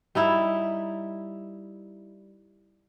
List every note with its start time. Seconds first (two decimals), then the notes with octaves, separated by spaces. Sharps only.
0.15 G3 D#4 E4